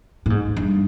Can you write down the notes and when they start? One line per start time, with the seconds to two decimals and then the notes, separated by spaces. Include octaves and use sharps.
0.26 A2
0.30 G#2
0.56 G2